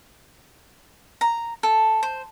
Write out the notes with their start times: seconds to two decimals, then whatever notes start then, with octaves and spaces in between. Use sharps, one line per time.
1.21 A#5
1.63 A4
2.03 C5